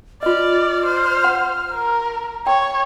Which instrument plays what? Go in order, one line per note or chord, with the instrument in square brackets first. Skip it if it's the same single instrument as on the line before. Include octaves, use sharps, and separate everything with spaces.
[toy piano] F4 D#5 [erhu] D5 [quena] F6
[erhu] C5
[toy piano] F#5
[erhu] A#4
[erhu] C#5 [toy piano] G5